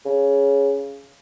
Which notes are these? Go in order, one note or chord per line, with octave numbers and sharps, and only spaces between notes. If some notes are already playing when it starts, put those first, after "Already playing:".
C#3